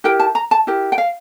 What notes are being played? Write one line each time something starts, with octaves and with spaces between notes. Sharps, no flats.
E4 G4 A#4 G5
A5
A#5
A5
E4 G4 A#4
G5
F5